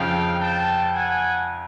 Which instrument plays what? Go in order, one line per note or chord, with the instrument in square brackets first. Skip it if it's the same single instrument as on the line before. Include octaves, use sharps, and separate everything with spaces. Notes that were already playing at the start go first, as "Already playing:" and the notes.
Already playing: [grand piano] F2 C#3 F3 [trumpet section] F5 G5
[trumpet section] G5 A5
F#5 G#5